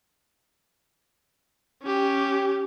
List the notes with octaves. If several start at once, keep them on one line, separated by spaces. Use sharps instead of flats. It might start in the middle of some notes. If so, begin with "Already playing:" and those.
C#4 G4